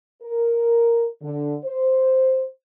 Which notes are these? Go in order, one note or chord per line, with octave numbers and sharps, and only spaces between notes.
A#4
D3
C5